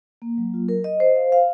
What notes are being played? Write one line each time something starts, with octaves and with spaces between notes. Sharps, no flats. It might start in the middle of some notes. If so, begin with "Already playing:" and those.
A#3
F#3
F4
A#4
D#5
C5
F5
F5